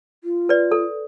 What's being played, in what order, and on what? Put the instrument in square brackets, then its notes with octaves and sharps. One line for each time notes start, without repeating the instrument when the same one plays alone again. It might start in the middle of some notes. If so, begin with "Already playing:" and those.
[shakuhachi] F4
[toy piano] B4 D5
A4